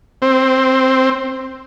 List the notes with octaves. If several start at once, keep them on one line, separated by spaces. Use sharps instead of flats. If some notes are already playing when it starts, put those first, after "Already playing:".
C4